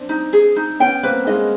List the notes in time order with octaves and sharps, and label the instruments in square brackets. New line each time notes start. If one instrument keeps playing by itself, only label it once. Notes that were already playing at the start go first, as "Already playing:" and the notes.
Already playing: [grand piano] C4 D4
[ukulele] D#4
G#4
D#4
[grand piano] B3 C#4 [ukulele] G5
[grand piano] A#3 C4 [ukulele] B4
[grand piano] G#3 A#3 [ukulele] D#5